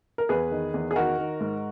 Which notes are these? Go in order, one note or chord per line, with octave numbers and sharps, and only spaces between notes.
A#4
E2 G#4 B4
D#3
E2
G#4
D#3 F#4 A#4
D#3
G#2